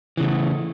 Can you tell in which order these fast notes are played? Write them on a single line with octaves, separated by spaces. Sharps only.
E3 C#3 A3